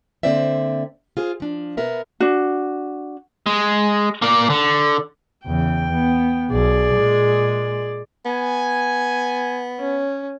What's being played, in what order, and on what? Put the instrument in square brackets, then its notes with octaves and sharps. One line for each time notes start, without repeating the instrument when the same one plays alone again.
[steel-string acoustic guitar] D3 A#3 C4 C5 D5 E5
F4 G#4 C5
F3 D4
B2 B3 A#4 E5
[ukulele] D4 F#4
[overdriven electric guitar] G#3
A#3 D5
D3
[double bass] E2 C#3 [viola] G5
[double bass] B3
[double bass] B1 [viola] G#4 D5
[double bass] A#2 G#3
[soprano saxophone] B3 [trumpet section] G#5
[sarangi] C#4